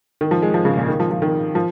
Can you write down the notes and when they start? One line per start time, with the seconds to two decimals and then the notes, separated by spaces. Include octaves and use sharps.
0.21 D#3
0.31 F3
0.42 G#3
0.54 F3
0.65 C#3
0.77 A#2
0.88 D#3
1.00 F3
1.11 F3
1.22 D#3
1.55 F3